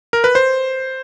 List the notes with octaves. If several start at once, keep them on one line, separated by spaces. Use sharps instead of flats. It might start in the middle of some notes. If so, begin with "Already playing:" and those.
A#4
B4
C5